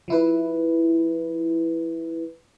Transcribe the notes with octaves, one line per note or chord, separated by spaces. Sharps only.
F3 E4 B4